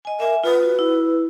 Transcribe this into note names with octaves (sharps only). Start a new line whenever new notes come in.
D#5 G#5
A#4 E5 G#5
F4 B4
F#4
E4